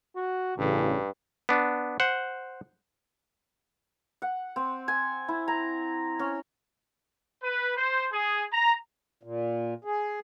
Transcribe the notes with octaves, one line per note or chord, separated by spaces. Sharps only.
F#4
A1 G2 C#3
B3 D4
C5 F#5
F#5
C4
G#5
E4
A#5
C#4
B4
C5
G#4
A#5
A#2
G#4